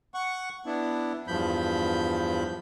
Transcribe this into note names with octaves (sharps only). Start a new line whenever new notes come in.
F#5 C#6
B3 D4 E4
E2 G2 F3 B5 G6